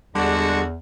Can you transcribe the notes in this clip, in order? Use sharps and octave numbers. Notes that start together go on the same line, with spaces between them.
E2 D3 G3 G#3 D4 F#4